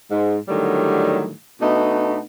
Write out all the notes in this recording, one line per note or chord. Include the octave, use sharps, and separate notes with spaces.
G#2
A2 D3 D#3 F#3 G3
B2 A3 B3 D4 D#4